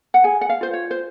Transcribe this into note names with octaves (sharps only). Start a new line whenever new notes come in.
F#5
G#4 G#5
F#5
F5
F4 C5
C#5
C5